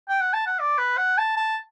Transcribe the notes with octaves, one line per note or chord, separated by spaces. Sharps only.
G5
F#5
A5
F#5
D5
B4
F#5
A5
A5